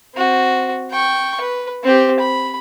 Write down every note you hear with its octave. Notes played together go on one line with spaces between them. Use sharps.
C4 F#4
G5 C#6
B4
C4 G4
B5